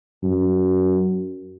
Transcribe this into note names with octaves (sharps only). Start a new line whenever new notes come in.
F#2